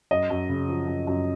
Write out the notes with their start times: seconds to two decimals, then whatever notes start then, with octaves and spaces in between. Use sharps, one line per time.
0.11 F#2 D#5
0.30 F#2
0.49 C#3
0.69 F3
0.88 F#2
1.07 F#2